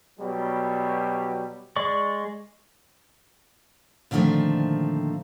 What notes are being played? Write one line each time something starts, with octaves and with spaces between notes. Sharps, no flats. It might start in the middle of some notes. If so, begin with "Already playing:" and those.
B2 F#3 G3
G#3 D5 C#6
A#2 D3 D#3 F3 A3 C4